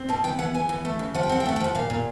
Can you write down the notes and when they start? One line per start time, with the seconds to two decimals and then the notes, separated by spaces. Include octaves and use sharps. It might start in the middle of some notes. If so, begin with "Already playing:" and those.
Already playing: C4
0.09 B2 A5
0.24 B3 G5
0.39 E3 F#5
0.54 B3 G#5
0.69 E3
0.85 A3
0.99 C#3
1.14 F3 F#5
1.23 G5
1.29 C4 F#5
1.40 G5
1.46 A3 F#5
1.56 G5
1.60 F3 F#5
1.75 A#2 F5
1.90 A#2